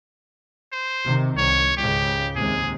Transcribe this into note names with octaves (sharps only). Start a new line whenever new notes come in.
C5
C3 D#3
C2 C#5
C#2 G#2 C#3 G4
D#2 C3 G#3 G#4